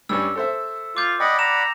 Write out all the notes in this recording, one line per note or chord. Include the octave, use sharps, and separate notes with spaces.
G2 G3 C#4 E6
A4 C5 E5
F4 D6 G6
D5 D#5 F#5 G5 B5
A#5 E7